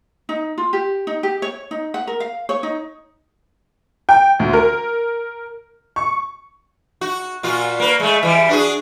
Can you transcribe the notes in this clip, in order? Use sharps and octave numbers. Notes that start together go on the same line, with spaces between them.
D#4
F4
G4
D#4
G4
C#5
D#4
F#5
A#4
F5
C#5
D#4
G5
D2
A#4
C#6
F#4
A#2 F4 F#4
A#3 B4
G#3 A3
E3 G3
D4 F#4 G#4